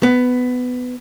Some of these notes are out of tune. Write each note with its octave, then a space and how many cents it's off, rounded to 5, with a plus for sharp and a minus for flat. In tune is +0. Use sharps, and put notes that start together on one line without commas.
B3 +15